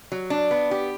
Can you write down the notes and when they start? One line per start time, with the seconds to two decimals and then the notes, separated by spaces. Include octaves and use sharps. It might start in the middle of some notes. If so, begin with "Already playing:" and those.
0.12 F#3
0.30 D4
0.51 B3
0.71 G4